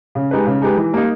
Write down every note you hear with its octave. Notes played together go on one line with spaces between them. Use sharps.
C#3
G#3 D#4 G4 B4
C#3
G#3 D#4 G4 B4
E3
G3 A#3 D#4